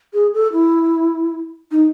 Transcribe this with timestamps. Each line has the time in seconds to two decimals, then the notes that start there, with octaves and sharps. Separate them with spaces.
0.13 G#4
0.34 A4
0.53 E4
1.71 D#4